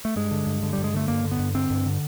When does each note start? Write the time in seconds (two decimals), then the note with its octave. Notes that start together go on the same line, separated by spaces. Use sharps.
0.05 A3
0.16 G2 G#3
0.31 D3
0.47 G2
0.63 D3
0.73 G3
0.78 G2
0.84 G#3
0.94 D3 A3
1.08 G2 A#3
1.24 D3
1.31 B3
1.39 G2
1.55 D3 C4
1.70 G2
1.86 D3